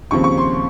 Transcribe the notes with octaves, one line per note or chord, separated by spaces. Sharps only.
D#2 C#3 F3 C4 C#6
C#6
C6